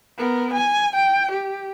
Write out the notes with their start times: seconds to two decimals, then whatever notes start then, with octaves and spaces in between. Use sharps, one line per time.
0.18 B3 A#4
0.53 G#5
0.95 G5
1.31 G4